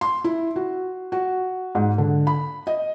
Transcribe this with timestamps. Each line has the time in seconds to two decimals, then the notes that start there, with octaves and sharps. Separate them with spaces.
0.01 C6
0.24 E4
0.56 F#4
1.12 F#4
1.75 G#2
1.98 D3
2.27 B5
2.67 D#5